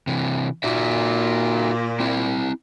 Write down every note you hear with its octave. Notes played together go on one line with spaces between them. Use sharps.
C3 E3
A#2 D#4 F#4 E5
C4 E4